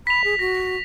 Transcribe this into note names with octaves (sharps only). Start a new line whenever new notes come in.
B5 B6 F7
G#4
F#4 A#6